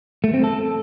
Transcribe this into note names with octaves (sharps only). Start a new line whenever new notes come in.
A3
C4
A4